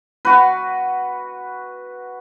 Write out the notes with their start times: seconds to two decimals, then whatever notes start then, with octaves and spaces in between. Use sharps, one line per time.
0.25 F#4 B4